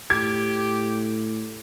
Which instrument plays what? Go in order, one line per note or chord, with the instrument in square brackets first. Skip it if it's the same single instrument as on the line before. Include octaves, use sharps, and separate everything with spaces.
[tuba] A2 [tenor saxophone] G4 [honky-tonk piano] G#6